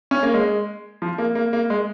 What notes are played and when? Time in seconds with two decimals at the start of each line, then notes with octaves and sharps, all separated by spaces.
0.11 C#4
0.23 A#3
0.34 G#3
1.02 F3
1.18 A#3
1.35 A#3
1.53 A#3
1.70 G#3